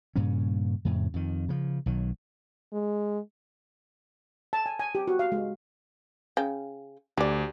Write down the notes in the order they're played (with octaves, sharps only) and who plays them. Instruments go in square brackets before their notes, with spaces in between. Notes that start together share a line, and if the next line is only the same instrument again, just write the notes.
[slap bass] G2 A#2 C#3 C#4
F2 A2 C#3
F2 D#3
C#3 F3
B1 D#3 F#3
[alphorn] G#3
[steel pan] A5
G#5
G#5
G4
F#4
F5
G#3
[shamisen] C#3 G5
[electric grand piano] D2 [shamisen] G4 D5